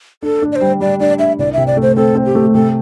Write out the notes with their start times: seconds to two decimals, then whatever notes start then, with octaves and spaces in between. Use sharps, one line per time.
0.23 D4 A4
0.42 D4
0.52 D5
0.56 C5
0.61 G3
0.80 G3 D5
1.00 D4 D5
1.19 D4 E5
1.39 C2 D5
1.53 C3 E5
1.67 D5
1.77 A3
1.82 C5
1.96 C4 A4
2.15 C4
2.26 G4
2.35 A3
2.54 C3 A4